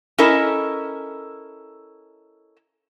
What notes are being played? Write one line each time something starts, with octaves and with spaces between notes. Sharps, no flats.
C#4 E4 A4 A#4 D#5